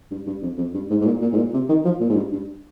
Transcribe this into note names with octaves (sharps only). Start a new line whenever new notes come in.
G2
G2
F2
F2
G2
G#2
G#2
A#2
A#2
G#2
A#2
C3
D#3
F3
A#2
G#2
G2
G2